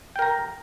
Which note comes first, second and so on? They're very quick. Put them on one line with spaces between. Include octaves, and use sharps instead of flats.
G5 A#4 A#5